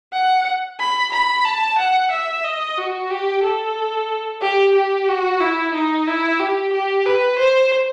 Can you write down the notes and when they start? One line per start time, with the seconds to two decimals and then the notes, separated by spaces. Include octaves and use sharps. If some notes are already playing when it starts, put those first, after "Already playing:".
0.13 F#5
0.80 B5
1.12 B5
1.45 A5
1.78 F#5
2.11 E5
2.44 D#5
2.78 F#4
3.10 G4
3.43 A4
4.41 G4
4.75 G4
5.09 F#4
5.41 E4
5.74 D#4
6.07 E4
6.40 G4
6.73 G4
7.06 B4
7.38 C5